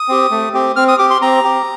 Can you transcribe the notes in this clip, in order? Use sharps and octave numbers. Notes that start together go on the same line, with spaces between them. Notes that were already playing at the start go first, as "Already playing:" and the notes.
Already playing: D#6
C4 G4
A3
C4 G4
C4 F6
D#6
G4 D6
C6
C4 A#5
G4